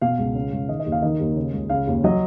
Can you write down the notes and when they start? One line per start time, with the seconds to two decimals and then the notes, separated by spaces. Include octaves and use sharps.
0.02 B2 F5
0.18 C#2
0.35 C#3
0.52 C#2
0.69 D#3 D#5
0.80 D#5
0.86 D#2
0.92 F5
1.02 D#3 D#5
1.20 D#2
1.36 C#3
1.53 C#2
1.69 C#3 F5
1.87 D#2
2.04 F#3 D#5